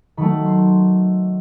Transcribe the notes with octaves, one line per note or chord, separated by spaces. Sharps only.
D#3 F#3 A3 B5
C6